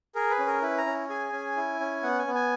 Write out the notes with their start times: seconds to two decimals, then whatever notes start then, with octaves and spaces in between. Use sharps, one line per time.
0.15 G#4 A#4
0.31 B4
0.39 C#4
0.47 A#4
0.62 E4 B4
0.78 A#5
0.86 C#4
1.09 G#4 G#5
1.33 C#4
1.56 E4
1.80 C#4
2.03 B3 F#5
2.19 G#5
2.27 B3
2.34 G#5